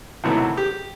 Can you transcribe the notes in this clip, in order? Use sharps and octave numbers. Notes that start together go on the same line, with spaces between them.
D#2 A2 C3 F#3 A3 B3
G4